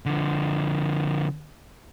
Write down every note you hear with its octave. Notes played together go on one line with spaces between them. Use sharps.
D3 F3